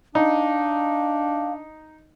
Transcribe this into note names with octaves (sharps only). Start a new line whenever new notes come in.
D4 D#4 F5